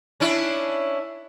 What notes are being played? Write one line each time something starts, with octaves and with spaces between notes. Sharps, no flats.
C#4 D4 E4